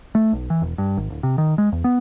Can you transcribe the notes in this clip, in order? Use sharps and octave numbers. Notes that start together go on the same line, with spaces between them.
A3
B1
E3
E1
G2
G#1
D1
C3
D#3
G#3
E2
B3